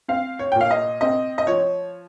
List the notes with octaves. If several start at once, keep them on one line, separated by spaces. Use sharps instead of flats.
C4 F5
C#5
A#2 G5
F5
D#5
C4 D#5
D#5
F3 C#5